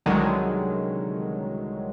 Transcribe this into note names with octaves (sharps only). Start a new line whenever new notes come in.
C2 D3 D#3 F#3 G#3